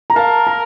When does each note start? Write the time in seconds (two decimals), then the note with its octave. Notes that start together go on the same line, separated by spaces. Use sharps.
0.10 A#5
0.16 A#4 F5 A5
0.47 A#5